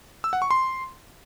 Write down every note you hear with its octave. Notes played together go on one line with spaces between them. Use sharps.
E6
F#5
C#6
C6